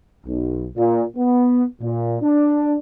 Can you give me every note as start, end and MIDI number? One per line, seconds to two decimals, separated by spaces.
0.26 0.65 35
0.76 1.03 46
1.16 1.63 59
1.81 2.17 46
2.22 2.77 62